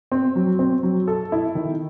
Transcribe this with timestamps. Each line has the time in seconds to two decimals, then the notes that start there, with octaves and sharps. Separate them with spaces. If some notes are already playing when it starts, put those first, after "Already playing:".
0.12 C4
0.36 F#3
0.59 C4
0.83 F#3
1.08 A4
1.32 E4
1.55 D#3